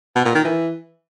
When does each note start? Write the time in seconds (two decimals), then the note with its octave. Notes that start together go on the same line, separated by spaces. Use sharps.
0.15 B2
0.25 A#2
0.35 D#3
0.45 E3